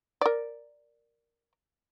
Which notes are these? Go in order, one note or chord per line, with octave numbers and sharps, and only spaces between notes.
A#4 D5